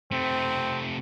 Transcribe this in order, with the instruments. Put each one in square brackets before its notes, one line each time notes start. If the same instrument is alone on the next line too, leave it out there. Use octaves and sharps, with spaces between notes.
[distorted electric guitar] C3 A3 [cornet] C4